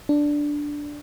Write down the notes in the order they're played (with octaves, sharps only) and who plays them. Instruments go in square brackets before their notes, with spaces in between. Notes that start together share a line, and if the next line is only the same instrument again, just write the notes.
[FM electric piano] D4